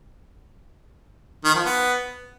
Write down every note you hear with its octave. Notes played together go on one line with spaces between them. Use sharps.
D#3
F3
B3